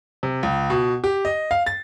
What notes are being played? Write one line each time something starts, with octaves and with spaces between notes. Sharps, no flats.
C3
C#2
B2
G4
D#5
F5
A6